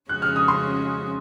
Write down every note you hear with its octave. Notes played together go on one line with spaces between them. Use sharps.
F2 C#3 G#3 C#4 F#4 F#6
F6
D#6
C6